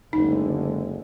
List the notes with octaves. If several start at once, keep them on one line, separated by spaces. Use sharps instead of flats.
F#1 D2 D3 G#3 D#4